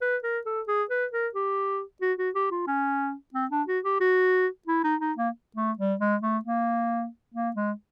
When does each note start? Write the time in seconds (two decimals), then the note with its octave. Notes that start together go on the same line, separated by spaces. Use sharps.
0.01 B4
0.23 A#4
0.46 A4
0.68 G#4
0.90 B4
1.13 A#4
1.34 G4
2.01 F#4
2.18 F#4
2.35 G4
2.51 F4
2.67 C#4
3.34 C4
3.51 D4
3.67 F#4
3.84 G4
4.00 F#4
4.67 E4
4.84 D#4
5.01 D#4
5.17 A#3
5.56 A3
5.78 G3
6.00 G#3
6.23 A3
6.45 A#3
7.34 A#3
7.56 G#3